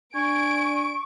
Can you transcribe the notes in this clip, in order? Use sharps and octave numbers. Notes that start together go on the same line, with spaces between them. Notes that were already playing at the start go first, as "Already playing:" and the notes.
D4 G#5 C#6 D7